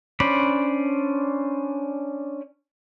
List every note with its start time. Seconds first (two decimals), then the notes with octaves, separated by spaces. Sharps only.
0.20 C#4 D4 C5 D5 B5